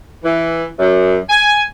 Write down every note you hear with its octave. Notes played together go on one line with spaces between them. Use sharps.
E3
F#2
G#5